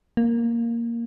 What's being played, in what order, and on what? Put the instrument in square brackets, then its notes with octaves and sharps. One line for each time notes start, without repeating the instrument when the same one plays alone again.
[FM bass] A#3